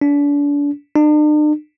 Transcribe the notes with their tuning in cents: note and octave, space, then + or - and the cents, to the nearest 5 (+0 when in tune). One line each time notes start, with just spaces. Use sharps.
D4 -35
D4 +45